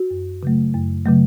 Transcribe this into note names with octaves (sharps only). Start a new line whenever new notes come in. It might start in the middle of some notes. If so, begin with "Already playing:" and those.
Already playing: F#4
F#2
C#3 F#3 A3
F#2
C#3 F#3 A3